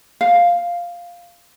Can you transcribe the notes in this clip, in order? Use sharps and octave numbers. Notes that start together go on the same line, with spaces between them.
F5